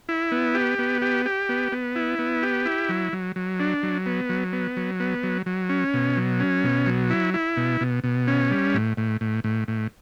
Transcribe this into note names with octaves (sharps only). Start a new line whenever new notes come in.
E4
B3
G4
B3
G4
G4
B3
B3
E4
B3
G4
E4
F#3
F#3
F#3
D4
F#3
B3
F#3
B3
F#3
B3
F#3
F#3
C#4
B2
F#3
C#4
B2
F#3
E4
E4
B2
B2
B2
C#4
G3
A2
A2
A2
A2
A2